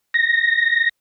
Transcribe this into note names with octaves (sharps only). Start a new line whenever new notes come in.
A#6